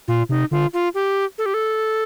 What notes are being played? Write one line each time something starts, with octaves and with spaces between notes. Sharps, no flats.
A#2 F4
C3 D#4
D3 F4
F4
G4
A4
G4
A4